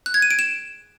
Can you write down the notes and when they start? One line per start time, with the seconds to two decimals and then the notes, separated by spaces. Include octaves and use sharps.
0.06 F#6
0.14 G#6
0.22 D#7
0.31 D7
0.39 E7